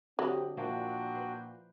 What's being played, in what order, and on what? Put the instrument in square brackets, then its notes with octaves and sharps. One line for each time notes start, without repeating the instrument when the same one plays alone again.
[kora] D3 D#5 [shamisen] F#3 [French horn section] C4 G4
[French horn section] A#2 [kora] F3 A#3 E4 [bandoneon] D4 F#4 G5
[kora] B4 C5